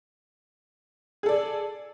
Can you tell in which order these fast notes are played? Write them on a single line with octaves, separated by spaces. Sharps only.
G#4 A4 D5